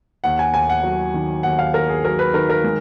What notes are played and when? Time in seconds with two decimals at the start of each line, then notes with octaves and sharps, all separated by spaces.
0.24 D#2 F#5
0.39 G#5
0.54 D#2 G#5
0.69 F#5
0.83 F#3
1.14 D#3
1.43 D#2 F#5
1.59 F5
1.74 D#2 A#4
1.89 G#4
2.05 F#3 A#4
2.19 B4
2.34 D#3 A#4
2.50 A#4
2.64 G#3